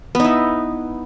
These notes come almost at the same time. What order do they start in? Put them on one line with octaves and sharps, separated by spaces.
B3 D#4 E4